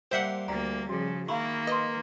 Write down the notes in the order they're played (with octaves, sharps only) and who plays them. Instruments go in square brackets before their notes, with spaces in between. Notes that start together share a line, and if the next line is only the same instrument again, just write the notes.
[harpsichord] G3 A#3 C6 [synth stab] C5 E5 F#5
[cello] D2 A#3 [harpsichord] G3 [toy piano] A#5
[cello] C#3 F3 [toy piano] F#4 G#4
[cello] D#3 A#3 [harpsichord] E4 [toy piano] F5 B5 C#6
[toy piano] B4 C6 [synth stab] D#5